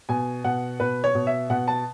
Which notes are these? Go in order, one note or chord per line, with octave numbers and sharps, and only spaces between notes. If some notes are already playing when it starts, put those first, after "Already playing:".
B2 G#5
B2 F#5
B2 B4
C#5
B2
E5
B2 F#5
A5